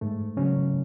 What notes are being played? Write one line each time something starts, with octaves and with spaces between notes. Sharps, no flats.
G#2 A3
C#3 F#3 C#4